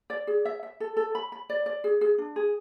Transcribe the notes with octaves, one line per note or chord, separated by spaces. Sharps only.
D5
G#4
E5
E5
A4
A4
B5
B5
D5
D5
G#4
G#4
D4
G#4